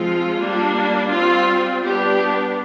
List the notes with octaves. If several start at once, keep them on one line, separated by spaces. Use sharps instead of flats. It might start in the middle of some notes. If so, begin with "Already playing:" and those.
Already playing: F3 G#3 C4 F4
G3 A#3 D4
G3 C4 F4
G3 B3 D4 G4